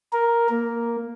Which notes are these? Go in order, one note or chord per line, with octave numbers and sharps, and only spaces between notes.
A#4
A#3